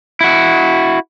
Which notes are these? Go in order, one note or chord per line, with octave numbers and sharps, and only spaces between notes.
E4 F#4